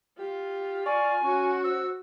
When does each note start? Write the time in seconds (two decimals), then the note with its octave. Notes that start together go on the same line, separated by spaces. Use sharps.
0.19 F4 G4
0.86 D5 G#5 C#6
1.23 C#4 F#4 C#6
1.64 C5 E6